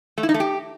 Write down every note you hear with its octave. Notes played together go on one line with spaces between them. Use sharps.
A3
E4
D#4
A3
G4